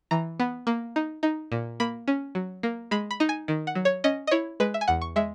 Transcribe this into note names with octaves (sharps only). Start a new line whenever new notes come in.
E3 A#5
B3
A#3
D#4
D#4
A#2
A#3 B5
C#4
F#3
A#3
G#3 B5
B5
D#4
G#5
D#3
F#5
F#3
C#5
C#4 D#5
D#5
E4 C#5
G#3 B4
E5
G#5
E2 F#5
C#6
G#3 E5